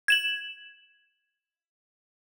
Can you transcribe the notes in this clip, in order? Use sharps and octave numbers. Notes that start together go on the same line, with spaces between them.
G#6 E7 F#7